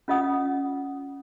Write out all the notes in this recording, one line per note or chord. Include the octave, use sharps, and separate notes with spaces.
C#4 F4 D#5 F#5 D#6